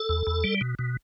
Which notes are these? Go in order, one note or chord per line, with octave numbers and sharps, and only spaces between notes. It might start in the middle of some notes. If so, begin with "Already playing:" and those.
Already playing: A4
E2
E2
G3
B2
B2